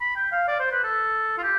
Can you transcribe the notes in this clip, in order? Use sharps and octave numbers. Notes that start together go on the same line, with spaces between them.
B5
G5
F5
D5
C5
B4
A4
F4
G4